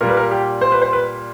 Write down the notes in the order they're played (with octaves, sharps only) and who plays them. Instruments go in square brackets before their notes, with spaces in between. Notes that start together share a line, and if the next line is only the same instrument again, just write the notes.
[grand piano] A#2 G3 A#4
B4
A#4
G4
C5
B4
C5
B4